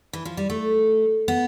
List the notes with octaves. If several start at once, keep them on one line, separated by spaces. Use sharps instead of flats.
E3
F3
G3
A3
B3